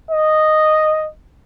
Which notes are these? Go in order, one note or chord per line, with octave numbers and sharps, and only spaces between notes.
D#5